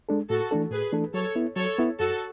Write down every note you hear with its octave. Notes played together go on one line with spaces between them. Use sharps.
G#3 D4 A4
A2 F#4 A4
E3 A3 D4 A4
A2 G#4 B4
E3 A3 D4 A4
F#3 A4 C#5
B3 E4
F#3 A4 C#5
B3 E4
F#2 F#4 A4